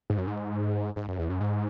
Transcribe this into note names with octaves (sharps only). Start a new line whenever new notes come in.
G#2
F#2
G#2
G#2
F#2
E2
F#2
G#2